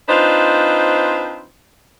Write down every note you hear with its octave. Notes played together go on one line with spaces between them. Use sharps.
C4 D4 D#4 F4 B4 C5